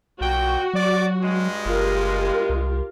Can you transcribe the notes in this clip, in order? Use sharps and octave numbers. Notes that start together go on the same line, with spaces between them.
B1 A#2 F#4 G5
F#3 D5
G2 G#3
F#1 F4 G4 A#4
C2